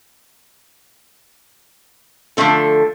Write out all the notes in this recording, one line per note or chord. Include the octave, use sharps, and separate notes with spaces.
D3 F3 A3 C4 A4